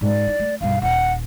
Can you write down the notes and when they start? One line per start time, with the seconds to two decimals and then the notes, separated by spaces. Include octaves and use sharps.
0.01 G#2 D5
0.27 D#4
0.40 A3
0.61 B1 G2 F5
0.82 D#1 F#5